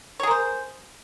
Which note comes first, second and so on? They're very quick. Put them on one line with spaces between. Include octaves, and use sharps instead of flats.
C#5 G#4 A#4 C5